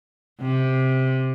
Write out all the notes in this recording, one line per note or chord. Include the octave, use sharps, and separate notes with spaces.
C3